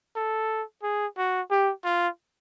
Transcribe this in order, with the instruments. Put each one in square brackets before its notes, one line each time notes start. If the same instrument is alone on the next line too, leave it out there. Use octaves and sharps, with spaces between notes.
[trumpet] A4
G#4
F#4
[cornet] G4
[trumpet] F4